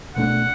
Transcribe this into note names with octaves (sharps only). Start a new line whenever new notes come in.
B2 A3 D4 F#5